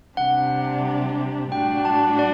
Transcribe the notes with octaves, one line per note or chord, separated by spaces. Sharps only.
C3 G3 D4 G4 F#5
A2 G3 D4 F#4 G5
A5
D5